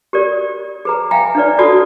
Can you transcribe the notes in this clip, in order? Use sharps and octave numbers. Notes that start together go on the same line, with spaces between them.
G4 A#4 D5
G#4 B4 A#5
E5 F5 G5 G#5 A#5
D4 D#4 B4 D5
F4 F#4 A4 D5 A5 D#6